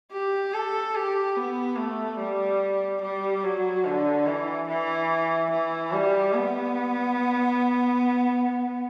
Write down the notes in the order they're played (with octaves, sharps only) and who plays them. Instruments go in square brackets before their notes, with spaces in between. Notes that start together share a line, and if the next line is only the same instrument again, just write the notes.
[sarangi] G4
A4
G4
B3
A3
G3
G3
F#3
D3
E3
E3
E3
G3
B3